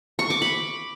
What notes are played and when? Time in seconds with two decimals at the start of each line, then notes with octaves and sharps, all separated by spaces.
0.19 C#6
0.30 D6
0.42 B5